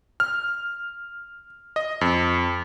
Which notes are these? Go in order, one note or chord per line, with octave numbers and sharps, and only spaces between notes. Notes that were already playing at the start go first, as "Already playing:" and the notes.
F6
D#5
F2